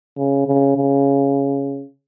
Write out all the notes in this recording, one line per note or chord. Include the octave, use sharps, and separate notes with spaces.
C#3
C#3
C#3